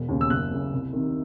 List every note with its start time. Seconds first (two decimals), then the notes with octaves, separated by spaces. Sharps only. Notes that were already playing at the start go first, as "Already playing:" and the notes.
Already playing: E1
0.09 D#2 C#3
0.21 E6
0.30 F#1 F#6
0.50 F#2 C#3
0.72 C2
0.93 C3 D#3